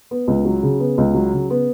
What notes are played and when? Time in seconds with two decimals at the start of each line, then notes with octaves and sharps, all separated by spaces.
0.11 B3
0.28 C#2
0.45 F#3
0.63 C#3
0.80 B3
0.98 C#2
1.14 F#3
1.33 C#3
1.50 B3